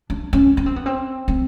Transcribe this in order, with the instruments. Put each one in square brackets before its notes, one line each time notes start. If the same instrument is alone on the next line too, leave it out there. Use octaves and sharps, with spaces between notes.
[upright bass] D4
C#4
C#4
C4
B3
C4
C4